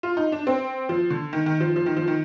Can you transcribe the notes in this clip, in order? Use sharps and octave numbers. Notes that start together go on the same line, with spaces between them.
F4
D#4
D4
C4
F3
D3
D#3
D#3
F3
F3
D#3
F3
D#3